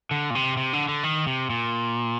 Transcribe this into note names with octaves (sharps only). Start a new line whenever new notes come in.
D3
A#2
C3
C3
D3
D3
D#3
C3
A#2